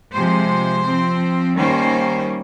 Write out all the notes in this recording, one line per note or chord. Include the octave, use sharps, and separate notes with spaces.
C3 F3 G#3 C5
F3 C4
D#3 G3 A#3 C#4 C5